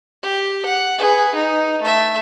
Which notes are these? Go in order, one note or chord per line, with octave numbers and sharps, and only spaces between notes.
G4
F#5
G#4 B4
D#4
A3 E5